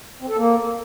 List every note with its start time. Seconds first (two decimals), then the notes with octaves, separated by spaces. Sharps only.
0.21 C4
0.29 A4
0.37 A#3